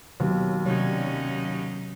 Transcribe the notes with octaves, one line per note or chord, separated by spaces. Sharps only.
D#2 B2 F#3
C3 F#3 G3 C#4 D#4 C#5